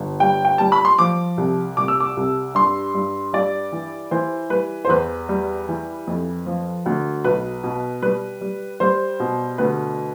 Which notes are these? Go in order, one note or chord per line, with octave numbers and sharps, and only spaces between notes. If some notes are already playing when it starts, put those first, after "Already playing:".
Already playing: G1
G3 G5
G5
G3 A5
B5
C6
F3 D6
C2
C2 D6
E6
D6
C2
G2 C6
G2
G3 D5
E3
E3 C5
G3 B4
C5
E2 B4
G3
E3
F2
F3
D2
B1 B4
B2
G3 B4
G3
G3 C5
B2
D2 B4